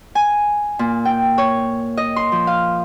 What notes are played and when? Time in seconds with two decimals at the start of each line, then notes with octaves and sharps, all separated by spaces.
0.15 G#5
0.79 A#2
1.05 G5
1.38 C#5
1.97 D#5
2.16 C6
2.32 F3
2.47 F5